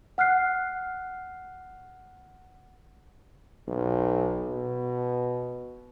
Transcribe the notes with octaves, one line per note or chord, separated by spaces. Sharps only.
F#5 F6 F#6 C7
B1
B2